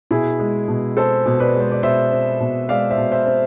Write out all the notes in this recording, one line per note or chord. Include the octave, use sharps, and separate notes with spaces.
B2 E4 G#4
G#3
B2
C4 A4 C5
B2
B4 D5
G#3
C5
D5
B2 C5 E5
C4
B2
G#3 D5 F5
C5 E5
B2
C5 E5
C4